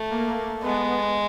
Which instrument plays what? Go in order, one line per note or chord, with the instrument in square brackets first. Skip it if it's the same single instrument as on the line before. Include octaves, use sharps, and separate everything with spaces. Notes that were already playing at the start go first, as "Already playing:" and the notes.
Already playing: [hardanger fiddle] A3
[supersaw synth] A#3
[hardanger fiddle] G#3 [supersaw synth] B3